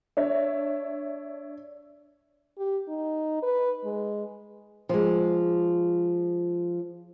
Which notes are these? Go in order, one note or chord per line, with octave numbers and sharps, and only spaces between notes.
D4 C#5 E5
G4
D#4
B4
G#3
F3 G#3